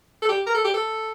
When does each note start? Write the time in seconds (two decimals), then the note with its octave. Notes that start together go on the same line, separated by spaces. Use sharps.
0.22 A4
0.29 G4
0.47 A#4
0.55 A4
0.64 G4
0.74 A4